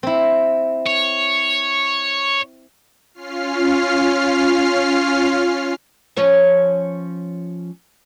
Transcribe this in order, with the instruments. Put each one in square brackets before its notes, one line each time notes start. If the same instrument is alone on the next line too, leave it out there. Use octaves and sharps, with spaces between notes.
[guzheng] C4 E4
[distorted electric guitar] C#5
[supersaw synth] C#4 F4 F6 C7
[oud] F3 C#4 C#5